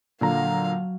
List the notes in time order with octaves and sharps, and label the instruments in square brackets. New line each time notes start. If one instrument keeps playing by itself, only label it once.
[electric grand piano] A#2 D3 A#5 [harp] F#3 [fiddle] F5